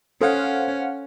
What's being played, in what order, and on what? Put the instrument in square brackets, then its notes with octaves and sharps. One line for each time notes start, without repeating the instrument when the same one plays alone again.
[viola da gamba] C#4 [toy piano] A4 [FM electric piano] C5 F5 F#5